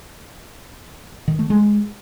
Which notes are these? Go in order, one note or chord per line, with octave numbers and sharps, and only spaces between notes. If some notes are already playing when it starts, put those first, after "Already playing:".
D#3
A3
G#3